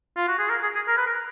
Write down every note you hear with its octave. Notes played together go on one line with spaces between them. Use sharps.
F4
F#4
G#4
A#4
G#4
G#4
A#4
B4
A#4